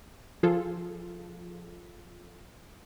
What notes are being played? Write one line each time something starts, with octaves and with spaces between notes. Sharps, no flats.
F3 F4 G#4 A4